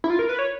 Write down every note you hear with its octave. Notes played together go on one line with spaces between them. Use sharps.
E4
F4
A#4
B4
C#5